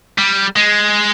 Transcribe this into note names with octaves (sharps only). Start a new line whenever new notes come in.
G3
G#3